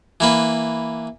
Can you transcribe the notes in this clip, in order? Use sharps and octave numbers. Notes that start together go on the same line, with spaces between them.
E3 A#3 B4